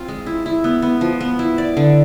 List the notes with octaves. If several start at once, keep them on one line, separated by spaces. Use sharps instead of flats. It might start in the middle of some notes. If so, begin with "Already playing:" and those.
Already playing: C4 F4
G#3
E4
E4
B3
B3
F3
B3
E4
D5
D3